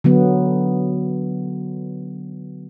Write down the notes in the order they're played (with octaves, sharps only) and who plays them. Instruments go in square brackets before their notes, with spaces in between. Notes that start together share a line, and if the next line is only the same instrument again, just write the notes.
[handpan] D3 F#3 B3